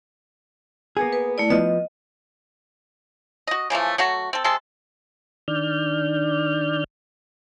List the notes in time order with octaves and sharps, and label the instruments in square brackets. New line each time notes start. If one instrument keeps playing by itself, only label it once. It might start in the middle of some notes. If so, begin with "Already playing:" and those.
[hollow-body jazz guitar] A#3 B3 G#4
[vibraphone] B4
A3 E4 D5
[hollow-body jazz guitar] F3 B3 [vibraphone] D#5
[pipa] F#4 D#5
C#3 E3 F3 A3
F#3 A3 F#4
C4 A4
C3 G#3 A4 C6
[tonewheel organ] D#3 D4 D5 F6 G6